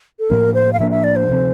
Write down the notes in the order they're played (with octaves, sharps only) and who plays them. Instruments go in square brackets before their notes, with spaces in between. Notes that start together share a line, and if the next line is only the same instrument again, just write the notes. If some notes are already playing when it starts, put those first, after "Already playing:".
[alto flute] A4
[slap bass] A2 F3 A#3 D4 [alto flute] A#4
[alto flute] C5
F5
[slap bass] A2 F3 A#3 D4 [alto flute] E5
[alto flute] E5
D5
C5
[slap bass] D2 C3 F3 C4